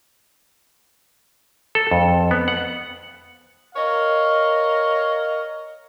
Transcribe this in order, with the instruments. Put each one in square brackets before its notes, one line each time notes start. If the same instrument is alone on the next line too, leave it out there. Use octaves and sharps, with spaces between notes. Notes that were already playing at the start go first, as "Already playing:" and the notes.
[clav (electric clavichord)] A4
F2
B3
F#5
[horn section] A#4 C#5 D#5 F5